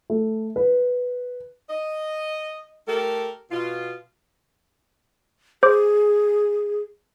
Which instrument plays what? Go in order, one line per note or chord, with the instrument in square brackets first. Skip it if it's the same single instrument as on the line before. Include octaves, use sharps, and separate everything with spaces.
[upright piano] A3
B4
[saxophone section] D#5
A3 G4 A4 A#4
B2 F4
[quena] G#4 [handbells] C5 D6